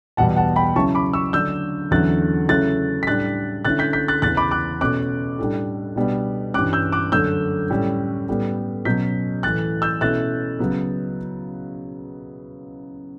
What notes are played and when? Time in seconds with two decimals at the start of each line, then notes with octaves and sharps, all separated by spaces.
0.17 E2 B2 G3 B3 F#5 A5
0.36 F#5 A5
0.56 G5 B5
0.76 C#3 F#3 C#4 E4 A5 C#6
0.95 B5 D6
1.13 C#6 E6
1.33 D3 F#3 A3 D4 E6 G6
1.91 E2 D3 F#3 C#4 E4 F#6 A6
2.49 C#3 F#3 A3 C#4 E4 F#6 A6
3.03 B6
3.07 A2 G3 D4 F#6 A6
3.65 D3 A3 C#4 E4 F#6 A6
3.79 G6 B6
3.93 G6 B6
4.08 F#6 A6
4.22 E2 C#3 E3 F#6 A6
4.37 B5 D6
4.51 D6 F#6
4.81 B2 A3 C#4 D6 F#6
5.39 A2 G3 D4
5.96 B2 G3 B3 D4
6.54 G2 E3 G3 C#4 D6 F#6
6.73 E6 G6
6.92 D6 F#6
7.12 F#2 D3 A3 C#4 E6 G6
7.70 A2 G3 C#4
8.28 A2 G3 B3
8.85 B2 F#3 C#4 G6 B6
9.43 A2 E3 A3 F#6 A6
9.82 E6 G6
10.01 B2 A3 C#4 E4 F#6 A6
10.59 C#3 F#3 B3